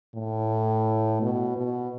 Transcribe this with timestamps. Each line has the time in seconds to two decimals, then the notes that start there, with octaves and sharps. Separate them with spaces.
0.15 A2
1.22 B2
1.57 B2